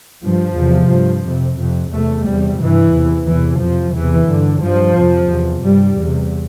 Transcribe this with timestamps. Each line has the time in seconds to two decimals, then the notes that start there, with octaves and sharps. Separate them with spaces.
0.24 G2 F3
0.57 E2 C3
0.92 G2
1.25 F2 C3
1.60 F2 C3
1.93 E2 C3 A3
2.26 E2 C3 G3
2.60 G2 E3
2.94 E2 C3
3.28 E2 C3 E3
3.62 F2 C3 F3
3.95 E2 C3 E3
4.29 G2 D3
4.63 G2 F3
4.97 F2 C3
5.31 E2 C3
5.64 G2 G3
5.98 E2 C3